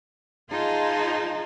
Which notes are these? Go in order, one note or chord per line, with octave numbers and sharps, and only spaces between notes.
D#4 F4 G#4 C5 D#5 A5